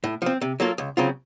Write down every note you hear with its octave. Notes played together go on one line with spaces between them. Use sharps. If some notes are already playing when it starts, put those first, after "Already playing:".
A2
F3 C4
C3
F#3 A#3 F4 A4
C#2
C#3 F#3 C4 F4